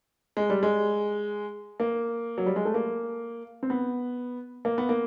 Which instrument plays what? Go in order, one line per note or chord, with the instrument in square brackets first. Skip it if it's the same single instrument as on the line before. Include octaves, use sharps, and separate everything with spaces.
[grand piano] G#3
G3
G#3
A#3
F#3
G3
G#3
A3
A#3
C4
B3
A#3
B3
A#3